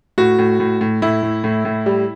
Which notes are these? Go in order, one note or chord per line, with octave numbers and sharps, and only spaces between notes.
A2 F#4
A2
A2
A2
A2 E4
A2
A2
A2
G3